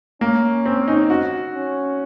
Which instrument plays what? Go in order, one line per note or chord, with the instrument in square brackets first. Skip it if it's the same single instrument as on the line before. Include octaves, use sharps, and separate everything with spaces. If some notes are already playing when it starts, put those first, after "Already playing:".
[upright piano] A#3 [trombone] C#4
[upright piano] C4
D#4
F#4
[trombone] C#4